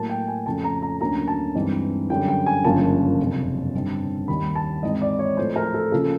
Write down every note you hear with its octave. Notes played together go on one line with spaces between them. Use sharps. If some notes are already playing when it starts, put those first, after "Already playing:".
Already playing: A2 F#3 A#3 A5
G5
G#5
F2 C#3 F3 A3 C#4 A5
A#5
A#5
D2 D3 F#3 A#3 C#4 A#5
A5
G2 E3 G#3 C4 D#4
F#2 D3 G3 G5
G5
G#5
G1 F#2 C#3 F3 A#3 A5
F#1 F2 C3
G2 D3 G3 C4 D#4
D#2 D#3 G3 B5
A5
G#2 E3 G#3 C4 D#4 D#5
D5
C#5
A2 F3 A3 C5
A#4
A4
C#3 F3 A#3 A4